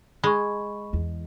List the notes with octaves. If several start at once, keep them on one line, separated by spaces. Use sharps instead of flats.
G#3 B5 C#6
E2